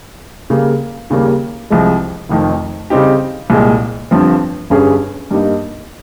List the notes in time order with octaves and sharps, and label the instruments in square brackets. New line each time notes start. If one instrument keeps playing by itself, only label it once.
[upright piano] C#3 G3 A#3
D#2 C#3 G3 A#3
C2 C3 F3 G#3
F1 F2 D#3
C#3 G3 C4 D#4 G4
C2 A#2 G#3
G1 G2 F3 C4
G1 G2 G3 C#4 G#4
G2 G3 A#3 D#4